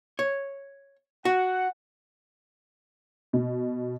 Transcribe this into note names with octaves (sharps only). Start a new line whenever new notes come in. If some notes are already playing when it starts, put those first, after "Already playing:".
C#5
F#4 F#5
B2